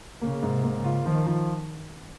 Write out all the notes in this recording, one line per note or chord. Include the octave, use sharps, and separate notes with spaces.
C#3 A#3
G#2
C3
A#3
C#3
F4
D#3 F3
F3